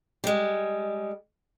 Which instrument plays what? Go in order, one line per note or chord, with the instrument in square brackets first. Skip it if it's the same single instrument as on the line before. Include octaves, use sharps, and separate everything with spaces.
[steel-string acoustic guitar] G3 G#3